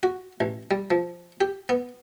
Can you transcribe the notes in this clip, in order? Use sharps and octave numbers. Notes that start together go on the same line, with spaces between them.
F#4
A1
G3
F3
G4
B3